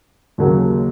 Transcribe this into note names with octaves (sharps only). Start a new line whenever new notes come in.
D#2 C#3 F#3 A#3